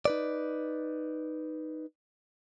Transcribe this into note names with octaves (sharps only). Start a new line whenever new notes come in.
D#4 B4 D5